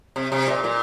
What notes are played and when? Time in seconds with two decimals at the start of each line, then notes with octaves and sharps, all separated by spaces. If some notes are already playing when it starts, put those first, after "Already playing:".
0.16 C3
0.32 C3
0.47 A#2
0.64 A#2